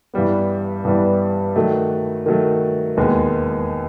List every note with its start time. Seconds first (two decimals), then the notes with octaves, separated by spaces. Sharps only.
0.14 G2 E3 G3 B3
0.85 G2 E3 G3 B3
1.56 D#3 F#3 A3
2.26 D#3 F#3 A3
2.97 E1 D#2 D#3 G#3 B3